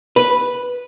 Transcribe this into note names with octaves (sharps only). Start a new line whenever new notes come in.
B4